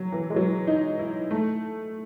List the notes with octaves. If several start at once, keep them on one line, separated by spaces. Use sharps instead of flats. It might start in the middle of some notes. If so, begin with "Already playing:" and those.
Already playing: F#3
E3
G#3
F#3
D#4
E4
A3